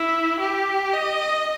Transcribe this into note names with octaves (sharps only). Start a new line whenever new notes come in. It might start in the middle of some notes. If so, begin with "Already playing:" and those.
Already playing: E4
G4
D#5